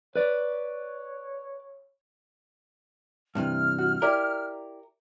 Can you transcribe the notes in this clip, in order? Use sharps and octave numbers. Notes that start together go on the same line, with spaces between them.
B4 C#5 D5
G2 C3 E3 F6
F#4
E4 G4 A#4 D5